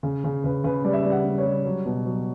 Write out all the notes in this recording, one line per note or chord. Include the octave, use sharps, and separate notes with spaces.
C#3
C#3
C#3 B4
C#3 B4
G3 D5
E5
D5
G3
F#5
G3
C#5
G3
F#3
B2
F#3